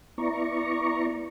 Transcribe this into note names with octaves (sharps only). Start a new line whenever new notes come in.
B3 E4 D5 A#5 C#6